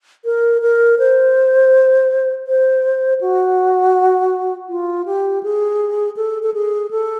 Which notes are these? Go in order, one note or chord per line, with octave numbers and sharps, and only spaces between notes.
A#4
A#4
C5
C5
F#4
F4
G4
G#4
A4
A4
G#4
A4